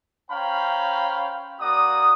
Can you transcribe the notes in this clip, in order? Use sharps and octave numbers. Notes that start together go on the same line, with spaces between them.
C#4 C5 F5 G5 A#5 B5
A#3 F#4 D5 D#6